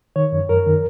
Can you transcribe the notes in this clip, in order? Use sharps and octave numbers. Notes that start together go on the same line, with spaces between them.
D#3 C#5
F#2
F#2 A#4
D#3